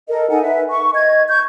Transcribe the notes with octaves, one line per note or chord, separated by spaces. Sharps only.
A4 A#4 D#5
D#4 A4 F#5 G#5
B4 E5
C#6
D#5 G#6
C#6 G6